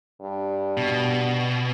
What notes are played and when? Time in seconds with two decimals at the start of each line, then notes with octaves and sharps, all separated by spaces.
0.21 G2
0.77 B2